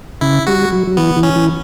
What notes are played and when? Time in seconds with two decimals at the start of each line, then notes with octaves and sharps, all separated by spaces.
0.21 C#3 E4
0.47 G3 F#4
0.72 F#3
0.87 F#3
0.97 E3 B3
1.16 E3
1.23 C#4
1.36 E3